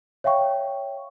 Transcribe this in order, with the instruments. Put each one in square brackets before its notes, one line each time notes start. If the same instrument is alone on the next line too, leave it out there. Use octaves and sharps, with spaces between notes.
[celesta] C#5 E5 F5 G5 C#6